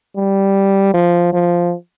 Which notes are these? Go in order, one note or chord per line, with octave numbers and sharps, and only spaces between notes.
G3
F3
F3